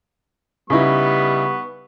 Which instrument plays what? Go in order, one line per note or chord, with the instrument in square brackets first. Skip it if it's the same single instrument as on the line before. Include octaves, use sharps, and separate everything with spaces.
[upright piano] C#3 D#4 E4 [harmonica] G3 B3 C#6